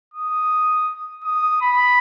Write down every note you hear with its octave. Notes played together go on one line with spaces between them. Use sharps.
D#6
D#6
B5